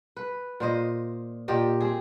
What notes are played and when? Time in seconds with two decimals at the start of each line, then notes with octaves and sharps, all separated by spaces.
0.17 B4
0.60 A#2 C5 D#5
1.48 A#2 G4 D#5
1.80 C4 G#4